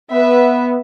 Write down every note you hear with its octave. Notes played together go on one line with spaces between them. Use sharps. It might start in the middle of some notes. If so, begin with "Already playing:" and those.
B3 B4 E5